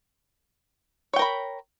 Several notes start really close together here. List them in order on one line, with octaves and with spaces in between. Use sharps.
C#5 G5 A#4 B5